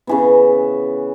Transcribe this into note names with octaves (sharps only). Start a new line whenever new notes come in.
C#3 E3 B3